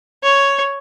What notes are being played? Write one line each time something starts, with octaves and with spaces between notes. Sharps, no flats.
C#5